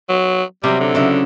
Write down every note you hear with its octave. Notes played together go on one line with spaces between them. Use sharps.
F#3
C3 F#3 G3
D3
C#3 F#3 E4